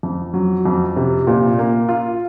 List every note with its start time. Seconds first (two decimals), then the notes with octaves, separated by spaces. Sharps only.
0.03 F2
0.34 F#3
0.66 F2
0.96 C3
1.27 A#2
1.59 A#3
1.89 F4